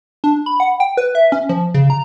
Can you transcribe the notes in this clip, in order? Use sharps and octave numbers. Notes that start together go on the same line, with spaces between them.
D4
B5
F#5
G5
B4
E5
C#4
F3
C#3
A#5